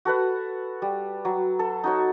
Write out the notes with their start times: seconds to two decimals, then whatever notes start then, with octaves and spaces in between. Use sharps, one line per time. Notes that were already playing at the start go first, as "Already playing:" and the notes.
0.05 F#4 A4 B4 F#5
0.82 G3
1.25 F#3
1.59 A4
1.84 D#4 F#4 C#5